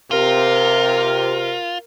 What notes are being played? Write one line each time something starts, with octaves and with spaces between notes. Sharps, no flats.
C3 F4 A#4